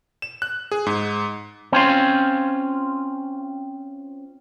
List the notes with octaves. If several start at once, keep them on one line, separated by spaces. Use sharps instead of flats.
E7
F#6
G#4
G#2
C4 C#4 F4